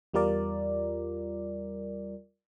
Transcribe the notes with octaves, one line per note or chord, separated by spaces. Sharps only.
E2 G3 F4 A#4 D5